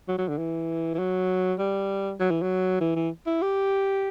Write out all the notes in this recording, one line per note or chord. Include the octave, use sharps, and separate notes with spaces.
F#3
F#3
D3
E3
E3
F#3
G3
F#3
E3
F#3
E3
E3
E4
G4